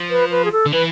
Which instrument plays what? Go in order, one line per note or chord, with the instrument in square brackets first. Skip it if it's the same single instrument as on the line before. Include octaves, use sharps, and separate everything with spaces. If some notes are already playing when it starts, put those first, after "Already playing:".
Already playing: [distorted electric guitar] F3
[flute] B4
B4
G#4
A4
[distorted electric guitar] D3
[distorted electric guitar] E3 [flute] B4